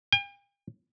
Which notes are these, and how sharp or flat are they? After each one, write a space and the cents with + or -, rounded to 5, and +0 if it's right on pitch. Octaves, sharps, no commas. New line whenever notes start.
G5 +45